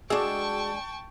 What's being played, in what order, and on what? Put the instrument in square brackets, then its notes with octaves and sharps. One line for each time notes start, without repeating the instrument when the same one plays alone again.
[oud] G#3 D4 [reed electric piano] F#4 G#4 E6 [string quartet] G5 A5 C#6